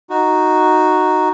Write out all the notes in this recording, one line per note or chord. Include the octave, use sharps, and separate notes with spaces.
D#4 F#4